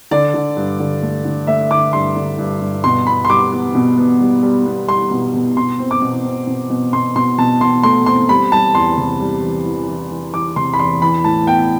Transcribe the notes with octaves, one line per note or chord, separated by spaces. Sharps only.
D3 D5
D3
G2
D3
A3
D3
A3 E5
D3 D6
G2 C6
D3
G2
G2
B2 C6
B3 B5
C6
G3 D6
B3
B2
B3
G3
G3
B3
G3 C6
B2
B2
B2 C6
C4
D6
B2
C4
B2
B2
B2 C6
B2 C6
B2 A5
B2 C6
A3 C6
C4 C6
G3 B5
G3 A5
E2 C6
C3
G3
E3
E3
E3
E3
E3 D6
C3 C6
B5
E2 C6
E3 B5
A2 A5
B3 G5